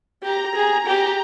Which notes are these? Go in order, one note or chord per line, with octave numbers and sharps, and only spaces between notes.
G4 A#5
G#4
G4